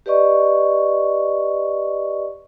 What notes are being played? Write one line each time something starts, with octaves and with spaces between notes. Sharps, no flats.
G4 B4 D5 D#5 C#6